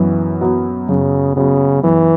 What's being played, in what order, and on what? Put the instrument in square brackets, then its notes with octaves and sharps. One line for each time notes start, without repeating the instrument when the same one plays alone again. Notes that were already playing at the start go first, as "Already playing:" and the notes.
Already playing: [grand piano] F#2 B3 [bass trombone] E3
[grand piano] F#3 B3
[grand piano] F#2 [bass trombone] C#3
[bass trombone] C#3 [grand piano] F#3 B3
[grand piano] F#2 [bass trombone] E3